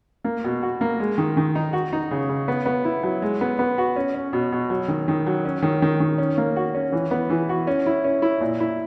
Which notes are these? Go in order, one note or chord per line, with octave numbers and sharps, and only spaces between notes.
A#3
B2
F#4
A#3
G#3
D#3
D#3
D#4
F#4
D#4
C#3
C#3
B3
B3
E4
F#3
G#3
B3
B3
F#4
C#4
C#4
B2
B2
F#3
D#3
D#3
F#3
C#4
D#3
D#3
D#3
C#4
A#3
F#4
C#4
E3
B3
E3
F#4
C#4
E4
C#4
E4
A#2
E4